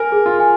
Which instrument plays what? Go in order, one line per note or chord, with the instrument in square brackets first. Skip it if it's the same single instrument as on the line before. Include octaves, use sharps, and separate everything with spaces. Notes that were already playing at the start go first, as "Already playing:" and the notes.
Already playing: [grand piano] A#4 [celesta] G#5
[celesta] G#4
[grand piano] F4
[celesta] G#5